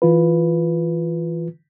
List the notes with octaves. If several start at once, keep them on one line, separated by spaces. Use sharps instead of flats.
E3 F4 B4